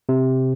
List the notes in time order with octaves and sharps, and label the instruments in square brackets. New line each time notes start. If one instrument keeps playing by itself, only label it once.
[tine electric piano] C3